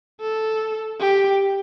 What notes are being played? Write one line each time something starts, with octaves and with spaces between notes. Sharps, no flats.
A4
G4